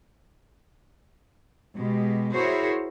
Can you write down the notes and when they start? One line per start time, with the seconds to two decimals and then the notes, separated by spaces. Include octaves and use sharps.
1.76 B2 G#3 G4
2.32 E4 F#4 G#4 A#4 C5 C#5